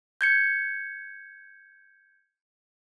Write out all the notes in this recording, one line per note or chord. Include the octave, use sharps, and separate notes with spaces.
G6 G#6 C#7